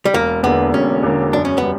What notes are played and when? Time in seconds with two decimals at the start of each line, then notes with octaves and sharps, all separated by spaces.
0.05 G3
0.13 E1 A#3
0.43 E2 D3 A#3 B3
0.74 E1 C#4
1.03 E2 D3 A#3
1.33 F#2 D4
1.45 C#4
1.58 G3 B3